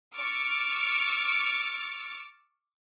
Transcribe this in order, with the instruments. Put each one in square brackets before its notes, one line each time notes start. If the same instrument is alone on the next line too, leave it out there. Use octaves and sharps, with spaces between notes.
[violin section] C#6 D6 E6 F6 A6 D7